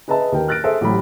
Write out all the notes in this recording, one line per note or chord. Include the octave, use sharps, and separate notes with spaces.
G#4 B4 D#5 E5 A5
D#2 A#4 G5
F6 F#6 A6 A#6 D7
G#4 A4 C5 E5
A1 F#3 G4 B5